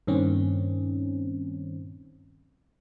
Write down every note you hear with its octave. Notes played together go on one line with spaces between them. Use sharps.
G2 A#2 D#3 C4 C#4